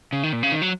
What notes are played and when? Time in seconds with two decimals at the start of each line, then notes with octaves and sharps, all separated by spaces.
0.13 C#3
0.23 D#3
0.33 A#2
0.43 C#3
0.52 D#3
0.62 F#3